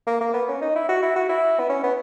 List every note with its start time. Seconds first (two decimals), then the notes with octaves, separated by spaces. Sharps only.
0.07 A#3
0.21 A#3
0.34 B3
0.48 C#4
0.62 D#4
0.75 E4
0.89 F#4
1.02 E4
1.16 F#4
1.29 E4
1.59 B3
1.69 C#4
1.83 B3